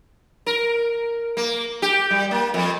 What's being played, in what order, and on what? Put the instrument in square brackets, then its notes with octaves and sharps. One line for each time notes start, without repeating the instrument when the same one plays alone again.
[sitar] A#4
A#3
G4
G3
A#3
F2